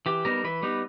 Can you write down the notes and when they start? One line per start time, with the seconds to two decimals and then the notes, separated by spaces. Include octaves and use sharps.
0.06 E3 G4
0.25 G3 B3 D#4 A#4
0.44 E3 B4
0.63 G3 B3 D#4